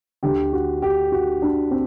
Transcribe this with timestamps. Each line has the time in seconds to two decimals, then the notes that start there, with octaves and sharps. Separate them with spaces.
0.23 D2 D3 G4
0.53 F#4
0.82 G4
1.12 F#4
1.42 D4
1.71 C4